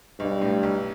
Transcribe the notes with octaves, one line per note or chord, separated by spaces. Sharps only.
B1 G2
A2
B1